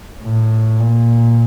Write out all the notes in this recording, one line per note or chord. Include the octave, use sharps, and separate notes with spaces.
A2
A#2